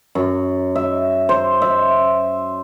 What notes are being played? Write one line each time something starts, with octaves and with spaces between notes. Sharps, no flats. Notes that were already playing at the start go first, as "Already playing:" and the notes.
F#2
E5
C5
E5